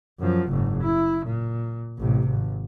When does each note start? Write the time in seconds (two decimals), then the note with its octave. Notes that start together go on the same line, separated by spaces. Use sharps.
0.20 F#2 F3
0.49 F#1 G#2
0.82 E4
1.26 A#2
1.99 A1 C3
2.28 G#1